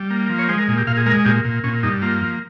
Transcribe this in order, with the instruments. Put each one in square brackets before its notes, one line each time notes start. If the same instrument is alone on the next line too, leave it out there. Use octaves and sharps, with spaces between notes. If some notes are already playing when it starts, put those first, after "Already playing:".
Already playing: [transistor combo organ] G3
A#3
F3
C#5
G#3 C5
A#4
A#2
G4
A#2 F5
G#4
G#3 A#4
A#2 G4
A#2
A#2 C#4
G2 D#4
A#3 F4
F3